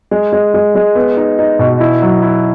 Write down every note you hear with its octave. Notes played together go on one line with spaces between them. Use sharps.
G#3
G#3
G#3
G#3
B3
D#4
D#4
B2
E4
F#3
E4